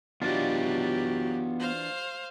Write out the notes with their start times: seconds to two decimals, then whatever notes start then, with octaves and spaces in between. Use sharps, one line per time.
0.22 E3 F#3 B3 D4 F4 G4 D5 D#5
1.60 C5 F5